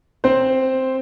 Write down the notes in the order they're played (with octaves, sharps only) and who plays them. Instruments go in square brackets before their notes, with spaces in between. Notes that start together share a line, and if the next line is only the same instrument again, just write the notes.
[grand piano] C4 C5